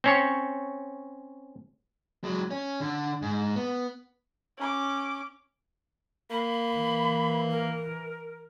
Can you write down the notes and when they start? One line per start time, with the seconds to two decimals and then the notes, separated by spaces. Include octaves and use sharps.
0.04 C4 C#4 C#5
2.24 F#3 G#3
2.51 C#4
2.80 D3
3.22 G#2
3.56 B3
4.57 C#4 D6
6.30 A#3 B5
6.76 E3
7.50 A#4